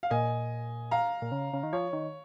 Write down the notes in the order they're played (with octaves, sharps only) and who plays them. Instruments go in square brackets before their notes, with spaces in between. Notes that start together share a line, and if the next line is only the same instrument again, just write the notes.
[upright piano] F5
[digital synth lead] A#2 [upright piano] D#5 G#5
[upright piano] F5 A#5
[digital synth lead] A#2
C#3
C#3
D#3
[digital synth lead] F3 [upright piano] C#5
[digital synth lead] D#3